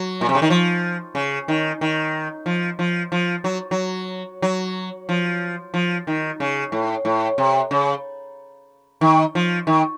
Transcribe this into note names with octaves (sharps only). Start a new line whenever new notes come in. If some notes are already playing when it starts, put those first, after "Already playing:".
Already playing: F#3
A#2
C3
C#3
D#3
F3
C#3
D#3
D#3
F3
F3
F3
F#3
F#3
F#3
F3
F3
D#3
C#3
A2
A2
C3
C#3
D#3
F3
D#3